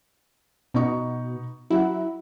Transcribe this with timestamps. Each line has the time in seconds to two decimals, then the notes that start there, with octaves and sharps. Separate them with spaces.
0.74 B2 B3 D#4 C#6
1.70 F#3 E4 F#5